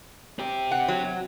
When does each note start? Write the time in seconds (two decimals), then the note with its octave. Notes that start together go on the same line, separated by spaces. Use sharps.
0.39 C4 G4
0.71 F#5
0.88 F#3